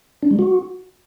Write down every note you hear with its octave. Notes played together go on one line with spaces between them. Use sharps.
D4
G3
F#4